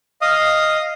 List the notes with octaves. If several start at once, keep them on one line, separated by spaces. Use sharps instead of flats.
D#5 F5 D#6